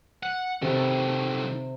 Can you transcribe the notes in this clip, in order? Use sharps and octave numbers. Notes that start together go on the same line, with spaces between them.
F#5
C3 D#3 A3